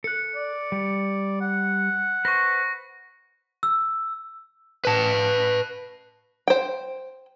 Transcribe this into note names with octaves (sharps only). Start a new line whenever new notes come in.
A4 F#6 C#7
D5
G3
F#5
B4 C5 C#6 A#6
E6
B4 A5
C5 G5